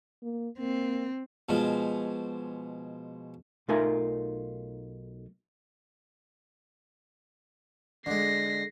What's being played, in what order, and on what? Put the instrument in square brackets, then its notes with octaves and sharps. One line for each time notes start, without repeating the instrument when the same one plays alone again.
[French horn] A#3
[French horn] A#3 [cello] C4
[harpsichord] B2 F3 G#3
[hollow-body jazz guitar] B1 A3 D#4 F4 A#4 G#5
[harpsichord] D3 G#3 [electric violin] A#6 C7